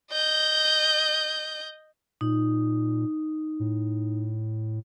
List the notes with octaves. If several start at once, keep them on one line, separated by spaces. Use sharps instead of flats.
D#5 G6
A#2 D#4
A2